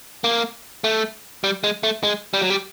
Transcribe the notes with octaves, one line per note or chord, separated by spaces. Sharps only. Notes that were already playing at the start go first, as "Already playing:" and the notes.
A#3
A3
G3
G#3
A3
G#3
G3
F#3
G3